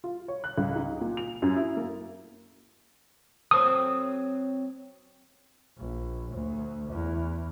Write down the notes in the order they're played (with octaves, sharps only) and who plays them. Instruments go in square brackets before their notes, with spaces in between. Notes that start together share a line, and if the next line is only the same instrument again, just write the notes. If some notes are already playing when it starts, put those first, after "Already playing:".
[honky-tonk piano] F4
C#5
F#6
C#2
D#4
A#2
F7
F#2
E4
A#3
[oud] F#3 C4 A4 [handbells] D#6
[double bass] A#1
D2
E2